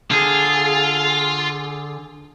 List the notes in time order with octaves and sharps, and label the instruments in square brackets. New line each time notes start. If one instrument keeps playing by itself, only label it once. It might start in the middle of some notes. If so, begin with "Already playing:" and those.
[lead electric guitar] D3 G#4 [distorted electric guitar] F4